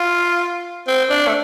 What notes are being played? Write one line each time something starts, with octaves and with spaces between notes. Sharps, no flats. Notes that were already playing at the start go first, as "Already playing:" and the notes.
Already playing: F4
C4
D4
A3